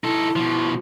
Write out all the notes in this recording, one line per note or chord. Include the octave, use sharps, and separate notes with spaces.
D#4 E4 A4
B2 F3